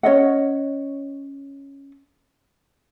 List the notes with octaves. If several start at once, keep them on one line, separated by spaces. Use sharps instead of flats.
C#4 C#5 D#5 F#5